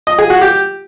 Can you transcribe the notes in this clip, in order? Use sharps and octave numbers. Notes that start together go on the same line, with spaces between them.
D#5
G#4
F#4
G4